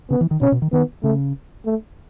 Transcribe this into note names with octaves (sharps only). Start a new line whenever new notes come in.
C#3 B3
E3
D#3
B2 C#4
B2
D#3
D#3 B3
C#3 A3
A3